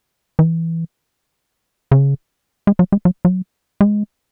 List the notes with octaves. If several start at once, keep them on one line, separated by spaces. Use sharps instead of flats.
E3
C#3
G#3
F#3
G#3
F#3
F#3
G#3